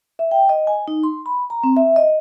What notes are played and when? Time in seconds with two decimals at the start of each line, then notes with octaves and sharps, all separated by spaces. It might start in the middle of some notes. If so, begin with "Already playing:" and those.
0.19 E5
0.31 G5
0.49 D#5
0.67 G#5
0.88 D#4
1.03 C6
1.26 B5
1.50 A#5
1.64 C4
1.77 E5
1.96 D#5